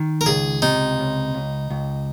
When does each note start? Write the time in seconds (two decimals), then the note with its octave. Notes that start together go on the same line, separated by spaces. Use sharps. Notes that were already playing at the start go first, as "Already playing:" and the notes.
Already playing: D#3
0.21 A#4
0.26 C#2 G#4
0.62 C3 D#4
0.99 C#2
1.34 C#2
1.70 C#2